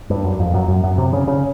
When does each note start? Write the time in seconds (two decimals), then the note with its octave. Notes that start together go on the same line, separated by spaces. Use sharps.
0.10 G2
0.24 F#2
0.40 F2
0.54 F#2
0.68 F#2
0.84 F#2
0.98 C3
1.13 C#3
1.27 C#3